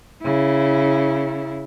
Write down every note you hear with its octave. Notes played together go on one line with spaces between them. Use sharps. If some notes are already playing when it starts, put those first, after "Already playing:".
C#3 E4